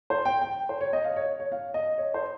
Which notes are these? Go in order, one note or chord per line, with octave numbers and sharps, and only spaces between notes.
C5
G5
G5
C5
C#5
D#5
F5
C#5
C#5
F5
D#5
C#5
C5